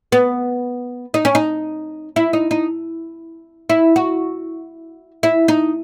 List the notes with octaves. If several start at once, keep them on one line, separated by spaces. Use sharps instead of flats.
B3
D#4
C#4
D#4
E4
D#4
D#4
E4
F#4
E4
D#4